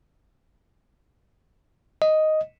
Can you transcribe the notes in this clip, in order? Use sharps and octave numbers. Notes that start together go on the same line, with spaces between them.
D#5